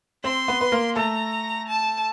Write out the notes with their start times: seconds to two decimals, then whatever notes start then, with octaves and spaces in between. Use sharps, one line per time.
0.24 C4 C5 C6
0.48 B3 B4
0.61 B4
0.72 A#3 A#4
0.96 A3 A4 A#5
1.69 A5